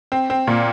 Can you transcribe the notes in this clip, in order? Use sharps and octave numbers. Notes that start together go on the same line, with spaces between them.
C4
C4
A#2